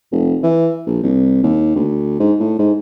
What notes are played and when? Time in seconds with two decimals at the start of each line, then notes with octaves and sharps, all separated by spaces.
0.12 F1
0.43 E3
0.87 A#1
1.03 C2
1.43 D#2
1.76 D2
2.20 G#2
2.40 A2
2.59 G#2